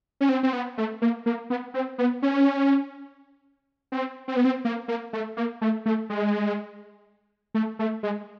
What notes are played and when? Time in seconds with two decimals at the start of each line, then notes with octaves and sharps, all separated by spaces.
0.21 C#4
0.29 C4
0.43 C4
0.53 B3
0.78 A3
1.02 A#3
1.26 A#3
1.50 B3
1.74 C4
1.98 B3
2.22 C#4
3.92 C4
4.28 C4
4.36 B3
4.45 C4
4.65 A#3
4.88 A#3
5.13 A3
5.37 A#3
5.61 A3
5.86 A3
6.10 G#3
7.54 A3
7.79 A3
8.03 G#3